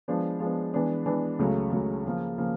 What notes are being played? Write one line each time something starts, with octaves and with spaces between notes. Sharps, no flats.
F3 G#3 B3 D4
F3 G#3 B3 D4
E3 G#3 B3 D4
E3 G#3 B3 D4
C#2 C#3 F#3 A3
C#2 C#3 F#3 A3
C#3 F3 A#3
C#3 F3 A#3